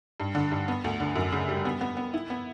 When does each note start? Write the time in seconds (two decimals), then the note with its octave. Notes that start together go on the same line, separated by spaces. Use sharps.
0.20 G2
0.35 D3
0.52 G2
0.68 B3
0.84 D2
1.00 D3
1.16 F#2
1.32 C#3
1.49 G3
1.65 B3
1.81 B3
1.97 B3
2.14 E4
2.30 B3